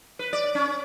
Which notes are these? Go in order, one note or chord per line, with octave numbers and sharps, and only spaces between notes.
B4
D5
C#4